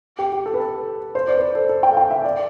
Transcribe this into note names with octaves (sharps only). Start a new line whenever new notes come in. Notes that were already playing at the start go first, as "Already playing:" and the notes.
G4
G4
A4
B4
A4
C5
D5
B4
C5
A4
A4
G5
F5
G5
E5
D5